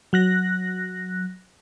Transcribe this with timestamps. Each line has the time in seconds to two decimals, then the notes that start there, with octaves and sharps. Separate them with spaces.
0.13 F#3 F#6 A#6